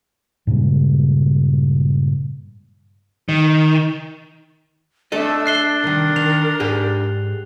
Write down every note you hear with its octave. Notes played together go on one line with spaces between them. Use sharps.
G2 A#2 C#3 G#3
D#3
A3 D4 A4 D#5 E5
F#6 C7 G7
C2 D#3 A#4
D#3 F7
G#2 G4 G#4